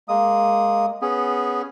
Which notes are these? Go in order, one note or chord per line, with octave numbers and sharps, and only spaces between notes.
G#3 A#3 D#6
B3 C#4 G#4